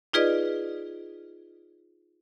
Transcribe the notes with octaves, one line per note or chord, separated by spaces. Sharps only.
D#4 F4 G#4 B4 D5 D#5